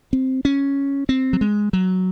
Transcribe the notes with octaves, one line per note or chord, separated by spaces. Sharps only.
C4
C#4
C4
F#3
G#3
F#3